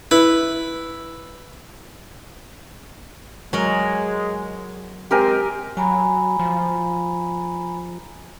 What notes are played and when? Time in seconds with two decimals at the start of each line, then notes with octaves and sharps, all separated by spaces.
0.11 E4 B4
3.53 F#3 G#3 A#4
5.11 G#3 C4 G4 A#4 G#5
5.77 F#3 G#5 A#5 B5
6.40 F3